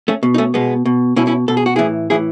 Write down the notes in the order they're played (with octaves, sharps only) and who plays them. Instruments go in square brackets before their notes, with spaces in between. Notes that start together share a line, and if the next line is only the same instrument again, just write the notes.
[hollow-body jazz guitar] A3 C#4
B2
D#4
A3 C#4
B2 G#3 B3
B2
B2 C#4 E4
C#4 E4
B2 A4
G#4
F#4
A2 E3 E4 G#4
A2 E3 E4 G#4